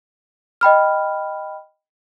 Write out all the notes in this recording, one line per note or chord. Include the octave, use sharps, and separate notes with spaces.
D#5 G5 B5 F6